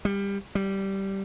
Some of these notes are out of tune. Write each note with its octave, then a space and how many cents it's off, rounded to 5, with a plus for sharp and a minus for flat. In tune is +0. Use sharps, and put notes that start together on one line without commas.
G3 +20
G3 -10